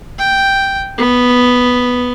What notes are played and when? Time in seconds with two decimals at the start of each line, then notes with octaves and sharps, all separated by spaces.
0.19 G5
0.98 B3